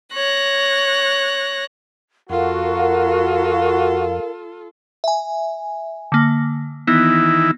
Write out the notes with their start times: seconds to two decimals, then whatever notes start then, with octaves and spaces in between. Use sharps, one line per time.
0.13 C#5 F#6 A#6
2.30 F2 F4 F#4 A4 A#4 F5
5.04 E5 G#5
6.12 D3 A#3
6.87 D#3 E3 B3 E4 A#6